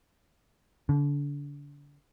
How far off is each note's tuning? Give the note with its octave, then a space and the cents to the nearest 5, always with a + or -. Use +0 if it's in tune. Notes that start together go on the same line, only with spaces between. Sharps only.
D3 -35